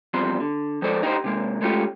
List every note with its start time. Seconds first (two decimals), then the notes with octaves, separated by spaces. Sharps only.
0.14 E2 F3 G3 C4 C6
0.40 D3
0.82 F3 G#3 A4 C5 D5
1.03 D#4 G4 C5
1.24 C3 G#3 A#3
1.61 G#3 A3 C#4 F4 G4